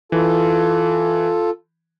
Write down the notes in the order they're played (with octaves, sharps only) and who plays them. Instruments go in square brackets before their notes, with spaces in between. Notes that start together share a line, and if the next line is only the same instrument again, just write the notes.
[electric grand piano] E3 [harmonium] F4 A4